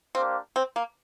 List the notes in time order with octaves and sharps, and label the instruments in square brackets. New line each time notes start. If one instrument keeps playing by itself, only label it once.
[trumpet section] A#3 D4 G4 C5 F5 [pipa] C4
[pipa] C4
A#3